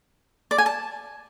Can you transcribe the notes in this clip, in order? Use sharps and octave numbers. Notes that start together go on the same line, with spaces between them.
D5
G#5
A5